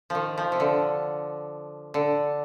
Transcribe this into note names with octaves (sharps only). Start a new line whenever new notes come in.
D#3 F3
F3
C3
D3
D3